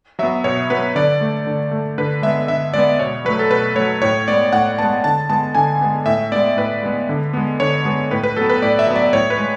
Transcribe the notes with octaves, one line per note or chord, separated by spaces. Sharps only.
F#3 B3 E5
B2 C#5
F#3 B3 B4
D3 D5
A3
D3
A3
D3 B4
G#3 B3 E5
D3 E5
G#3 B3 D5
B2 C#5
F#3 A3 B4
A4
B2 B4
F#3 A3 C#5
A2 C#5
G#3 B3 D5
A2 F#5
G#3 B3 A5
D3 A5
G#3 B3 A5
D3 G#5
G#3 B3
A2 E5
G#3 B3 D5
A2 B4
G#3 B3
D3
G#3 B3
D3 C#5
G#3 B3
A2 B4
B4
F#3 B3 A4
B4
A2 D5
E5
F#3 B3
D5
A2 C#5
B4
G#3